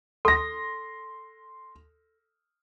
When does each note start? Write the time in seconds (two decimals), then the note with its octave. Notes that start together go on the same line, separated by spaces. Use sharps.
0.25 A4 C6 A#6